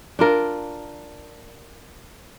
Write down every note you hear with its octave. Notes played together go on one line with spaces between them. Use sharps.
D4 F4 A#4